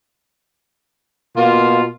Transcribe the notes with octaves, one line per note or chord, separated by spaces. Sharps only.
B2 A#3 F4